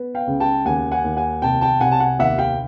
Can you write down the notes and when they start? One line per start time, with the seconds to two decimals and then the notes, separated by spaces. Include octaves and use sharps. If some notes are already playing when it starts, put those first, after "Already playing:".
Already playing: B3
0.15 F5 G5
0.27 C#2
0.40 G5 A5
0.65 D#2 F#5 G#5
0.91 F#5 G#5
1.04 D#2
1.17 F#5 G#5
1.42 C2 G5 A5
1.61 G5 A5
1.80 C2 F#5 G#5
1.92 A5
2.00 F#5 G#5
2.19 D#2 E5 F#5
2.38 F5 G5